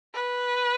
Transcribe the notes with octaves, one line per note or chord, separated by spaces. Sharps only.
B4